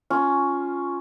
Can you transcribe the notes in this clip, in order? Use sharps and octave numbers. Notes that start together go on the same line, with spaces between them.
C#4 F4